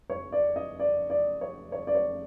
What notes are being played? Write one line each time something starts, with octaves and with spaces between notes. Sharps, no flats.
C#5
D5
D#5
D5
D5
C#5
C#5
D5
C#5